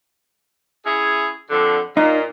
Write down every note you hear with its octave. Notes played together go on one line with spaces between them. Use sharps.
C#4 E4 G#4
F2 D3
A#2 D#4